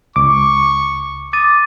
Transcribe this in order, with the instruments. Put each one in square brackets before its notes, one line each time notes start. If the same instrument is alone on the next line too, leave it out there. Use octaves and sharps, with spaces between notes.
[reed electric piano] C#2 D6 [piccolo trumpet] C#6
[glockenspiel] D6 A6 D#7 [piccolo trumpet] D#6